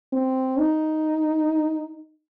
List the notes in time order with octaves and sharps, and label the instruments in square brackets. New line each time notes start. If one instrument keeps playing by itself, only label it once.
[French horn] C4
D#4